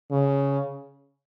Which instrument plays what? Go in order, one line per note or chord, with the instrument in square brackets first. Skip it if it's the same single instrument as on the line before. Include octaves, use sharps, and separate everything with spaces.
[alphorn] C#3